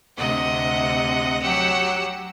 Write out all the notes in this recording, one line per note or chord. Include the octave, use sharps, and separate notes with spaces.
D2 C3 D#5 F#5 D#6
F#3 G4 F#5 E6